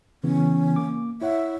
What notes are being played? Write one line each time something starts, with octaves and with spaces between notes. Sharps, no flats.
C#3 E3 B3 C#4
A#3 D6
E4 C#5 E5 F#5